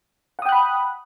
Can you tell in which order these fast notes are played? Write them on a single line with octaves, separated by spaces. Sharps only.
F#5 D#6 G5 F#6 B5